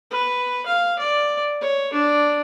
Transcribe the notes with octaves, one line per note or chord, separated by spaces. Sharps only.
B4
F5
D5
C#5
D4